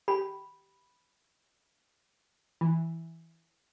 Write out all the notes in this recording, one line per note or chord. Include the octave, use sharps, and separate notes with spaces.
G4 B5
E3